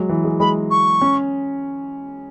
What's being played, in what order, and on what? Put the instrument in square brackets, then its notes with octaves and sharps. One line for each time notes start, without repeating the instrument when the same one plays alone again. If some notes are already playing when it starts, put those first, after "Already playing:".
Already playing: [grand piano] F#3 G#3
E3
G#3
[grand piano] G#3 [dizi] B5
[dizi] C#6
[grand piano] C#4